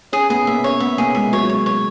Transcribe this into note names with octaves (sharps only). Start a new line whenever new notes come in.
C#4 G#4
B3 G#4
A#3 E5
C#4 C#5
B3 E5
A#3 G#4
G#3 E5
F#3 C#5
C#5
C#5